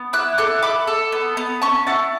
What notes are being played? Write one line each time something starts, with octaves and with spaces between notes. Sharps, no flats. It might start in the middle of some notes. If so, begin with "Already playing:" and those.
Already playing: B3
E4 D6 F#6
A4 D6 F#6
A4 B5 D6
A4
B3
B3
C#4 A5 C#6
E4 F#5 A5